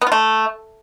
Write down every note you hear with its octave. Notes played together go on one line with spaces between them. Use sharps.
B3
F4
A3